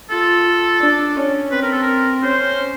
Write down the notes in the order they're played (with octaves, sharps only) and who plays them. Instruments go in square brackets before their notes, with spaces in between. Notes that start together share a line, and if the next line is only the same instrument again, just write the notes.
[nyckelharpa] F4 [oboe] A4
[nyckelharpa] D4
C#4
[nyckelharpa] C4 [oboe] B4
[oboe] A#4
A4
A#4
[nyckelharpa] C#4 [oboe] C5